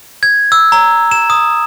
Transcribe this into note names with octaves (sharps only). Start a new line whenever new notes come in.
G#6
E6
A#5
E7
D#6